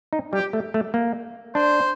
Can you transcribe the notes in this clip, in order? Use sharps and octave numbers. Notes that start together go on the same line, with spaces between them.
D#4
G3 G4
A3
A3
A#3
D4 C5